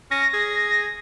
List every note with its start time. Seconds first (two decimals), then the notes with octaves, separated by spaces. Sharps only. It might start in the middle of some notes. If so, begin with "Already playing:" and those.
0.11 C#4 A#6
0.34 G#4